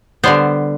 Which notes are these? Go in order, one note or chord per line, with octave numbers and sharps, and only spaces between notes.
D3 G3 B3 C5